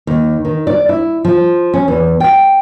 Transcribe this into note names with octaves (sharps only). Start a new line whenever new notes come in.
D#2
D#3
D5
E4
F3
C#4
E2
G5